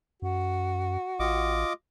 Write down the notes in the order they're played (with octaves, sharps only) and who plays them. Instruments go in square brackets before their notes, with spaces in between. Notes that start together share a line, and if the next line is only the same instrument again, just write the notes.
[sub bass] F#2 [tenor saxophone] F#4
[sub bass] A1 [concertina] F4 D#5 D6